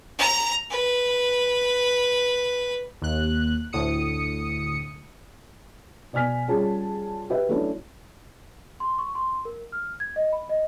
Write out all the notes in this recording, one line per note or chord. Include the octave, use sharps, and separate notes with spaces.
A#5
B4
D#2 F#6
D2 A2 D#6 C#7
B2 D5 G#5 F6 B6
G3 C#4 F4 G#4 A5
G4 B4 E5
F#3 A3 C#4 D4 E4
C6
C#6
C6
A#4
F6
G#6
D#5
B5
D#5